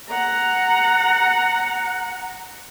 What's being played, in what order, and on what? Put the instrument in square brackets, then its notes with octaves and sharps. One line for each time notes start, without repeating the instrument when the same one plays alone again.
[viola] F#5 A#5